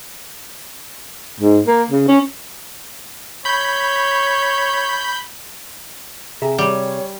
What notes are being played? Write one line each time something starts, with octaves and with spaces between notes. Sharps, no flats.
G#2
A#3
C#3
C#4
C#5 B5 G6
C3 G#4 E5 A#5
G3 C#5